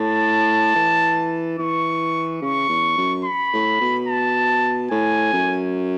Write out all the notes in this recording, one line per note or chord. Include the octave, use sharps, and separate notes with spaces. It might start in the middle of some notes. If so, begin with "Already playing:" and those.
Already playing: A2 A5
E3
E3 C#6
C#3 C#6
E2
F#2
B5
A2
B2
A5
A2 G#5
F#2